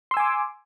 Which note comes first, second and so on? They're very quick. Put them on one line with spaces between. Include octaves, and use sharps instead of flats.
C6 E6 G#5 D6